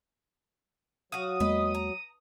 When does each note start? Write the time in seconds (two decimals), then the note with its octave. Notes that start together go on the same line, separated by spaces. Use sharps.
1.12 F#3 F#4 F5 D#6
1.40 E2 G#3 A#3 B4 D#5
1.75 A#5